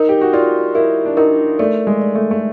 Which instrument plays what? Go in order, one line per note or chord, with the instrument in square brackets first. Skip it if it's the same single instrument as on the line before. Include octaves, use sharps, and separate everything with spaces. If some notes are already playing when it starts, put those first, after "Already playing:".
Already playing: [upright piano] D#4 [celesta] A#4
[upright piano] G4
F#4
[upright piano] F4 [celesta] D5
[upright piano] E4 [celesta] A#4
[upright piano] D4
[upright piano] D#4 [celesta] A#4
[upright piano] A3 [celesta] D5
[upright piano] G#3
[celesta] D5
[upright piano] A3
A3